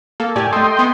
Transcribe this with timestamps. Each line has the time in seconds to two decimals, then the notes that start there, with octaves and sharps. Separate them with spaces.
0.20 A#3 A4
0.36 A2 G4 D5 G#5
0.53 A3 A4 D#5 G5 C6
0.79 B3